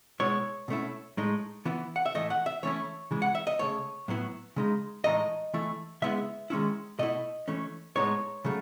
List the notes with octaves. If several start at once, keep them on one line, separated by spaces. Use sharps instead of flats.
B2 G#3 B3 E4 C#5
B2 A3 C#4 E4
A2 G#3 D#4
E3 B3 E4
F#5
E5
A2 E3 A3 D#5
F#5
E5
E3 A3 C#4 E4 C#5
C#3 E3 G#3
F#5
E5
D#5
C#3 F#3 A3 C#5
A2 F#3 B3 E4
C#3 G#3 D#4
A2 E3 G#3 D#4 D#5
E3 A3 E4
C#3 G#3 B3 E4 E5
D#3 G#3 C#4 E4
B2 A3 E4 D#5
E3 A3 C#4
A2 G#3 B3 D#4 C#5
C#3 F#3 A3